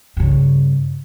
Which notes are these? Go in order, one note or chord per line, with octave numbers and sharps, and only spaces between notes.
G2 C#3